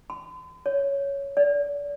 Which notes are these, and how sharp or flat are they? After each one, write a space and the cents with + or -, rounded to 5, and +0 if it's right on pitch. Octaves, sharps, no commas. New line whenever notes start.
C6 -45
C#5 +5
D5 -30